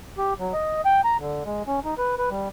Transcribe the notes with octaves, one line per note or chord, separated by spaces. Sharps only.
G4
F#3
D#5
G5
A#5
D3
G#3
C#4
D#4
B4
B4
G3